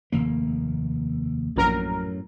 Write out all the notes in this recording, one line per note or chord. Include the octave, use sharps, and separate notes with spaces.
F1 D#2 A#3
A#1 F#2 A2 F#3 A#4